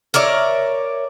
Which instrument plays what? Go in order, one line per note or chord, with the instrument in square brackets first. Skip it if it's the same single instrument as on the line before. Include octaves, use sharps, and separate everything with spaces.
[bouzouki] A#4 C#5 D5 E5